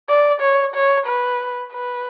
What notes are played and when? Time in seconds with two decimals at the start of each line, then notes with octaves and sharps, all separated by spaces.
0.09 D5
0.41 C#5
0.75 C#5
1.06 B4
1.72 B4